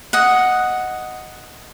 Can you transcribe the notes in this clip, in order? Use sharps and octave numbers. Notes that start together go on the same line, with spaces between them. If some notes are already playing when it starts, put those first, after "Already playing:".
D#5 F#5